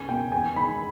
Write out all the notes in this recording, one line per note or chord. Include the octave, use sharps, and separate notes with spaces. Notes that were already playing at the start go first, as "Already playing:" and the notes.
Already playing: C#2 G#5
B2 A#3 G5
E2 G#5
D#3 G#3 B5